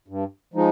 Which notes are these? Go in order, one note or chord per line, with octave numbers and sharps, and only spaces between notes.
G2
F3 G#3 D#4